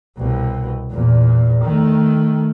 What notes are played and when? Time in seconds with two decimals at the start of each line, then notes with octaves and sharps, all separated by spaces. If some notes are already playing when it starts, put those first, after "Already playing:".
0.18 C2 B2
0.91 E2 A#2
1.62 D#3 A3